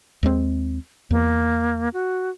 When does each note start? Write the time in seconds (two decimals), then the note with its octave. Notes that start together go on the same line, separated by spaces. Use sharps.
0.23 D#2 G#3 C4
1.11 E2 A#3
1.93 F#4